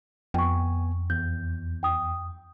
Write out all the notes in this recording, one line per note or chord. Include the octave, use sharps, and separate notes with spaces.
F2 B3 G5 G#5 C#6
E2 G6
G5 D#6